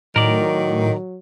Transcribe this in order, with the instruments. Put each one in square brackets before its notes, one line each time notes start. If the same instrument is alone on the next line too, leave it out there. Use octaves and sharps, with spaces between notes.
[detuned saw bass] A2 [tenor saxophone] D#3 [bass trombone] F#3 [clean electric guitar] A#4 D5